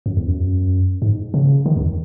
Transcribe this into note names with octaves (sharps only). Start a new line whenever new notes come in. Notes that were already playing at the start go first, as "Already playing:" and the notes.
F#2
E2
F#2
G#2
C#3
D#3
E2